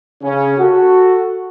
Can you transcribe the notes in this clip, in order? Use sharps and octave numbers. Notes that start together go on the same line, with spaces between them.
C#3 C#4
F#4 A4